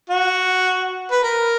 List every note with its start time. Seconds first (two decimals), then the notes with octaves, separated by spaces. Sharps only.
0.10 F#4
1.11 B4
1.23 A#4